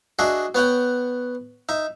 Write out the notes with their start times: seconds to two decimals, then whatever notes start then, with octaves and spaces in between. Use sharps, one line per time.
0.19 D4 F#4 G#4 D#5 E5
0.55 B3 C#5 F#5 G5
1.69 D#4 E5